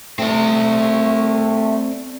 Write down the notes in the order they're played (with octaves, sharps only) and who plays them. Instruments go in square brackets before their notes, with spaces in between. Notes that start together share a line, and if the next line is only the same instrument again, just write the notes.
[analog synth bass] A3 [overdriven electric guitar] C4 D5